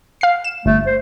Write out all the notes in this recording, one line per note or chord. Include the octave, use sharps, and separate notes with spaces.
F5 C7
E7
G1 A3
C5